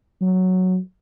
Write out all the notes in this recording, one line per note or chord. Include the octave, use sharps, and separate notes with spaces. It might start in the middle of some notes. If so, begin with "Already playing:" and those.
F#3